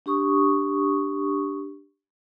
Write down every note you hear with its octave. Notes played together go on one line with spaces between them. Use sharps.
D4 G4 C#6 D#6